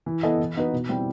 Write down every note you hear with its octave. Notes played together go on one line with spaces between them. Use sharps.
E3
B3 E4 A4 D#5
E3
B3 D#4 F#4 B4
B2
G3 C4 E4 G4